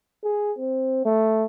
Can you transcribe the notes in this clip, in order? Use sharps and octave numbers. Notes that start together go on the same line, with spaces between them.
G#4
C4
A3